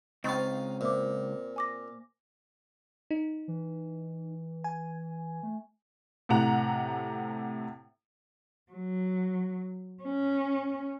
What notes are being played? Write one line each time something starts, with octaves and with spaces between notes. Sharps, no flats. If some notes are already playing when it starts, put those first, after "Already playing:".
C#2 C4 D#4 F5 C#6 A6
A#2 C5 E5 D6
G#5 D6 A#6
D#4
E3
G#5
A3
A2 C3 F#5 A#5
F#3
C#4